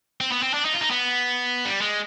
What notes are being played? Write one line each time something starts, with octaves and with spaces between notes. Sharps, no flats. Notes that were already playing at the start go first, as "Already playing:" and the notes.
C4
B3
C4
D4
D#4
F4
D#4
B3
G3
G#3